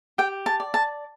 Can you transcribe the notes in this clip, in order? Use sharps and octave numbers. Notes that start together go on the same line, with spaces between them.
G4 G5
A5
D5
A5